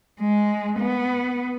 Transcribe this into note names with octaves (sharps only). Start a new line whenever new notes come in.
G#3
B3